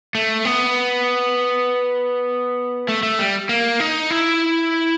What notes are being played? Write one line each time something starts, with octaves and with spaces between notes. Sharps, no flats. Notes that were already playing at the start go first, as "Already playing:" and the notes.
A3
B3
A3
A3
G3
A#3
D#4
E4